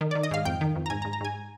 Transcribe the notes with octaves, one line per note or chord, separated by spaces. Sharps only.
D#3
D#3 D5
D#5
G#2 F5
F2 G5
D#3
F2
A#5
G#2 G#5
A#5
G#2
A#5
G#2 G#5